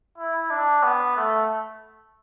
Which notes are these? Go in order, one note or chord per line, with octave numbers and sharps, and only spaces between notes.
E4
D4
B3
A3